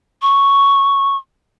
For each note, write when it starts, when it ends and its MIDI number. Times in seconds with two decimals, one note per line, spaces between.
0.22 1.17 85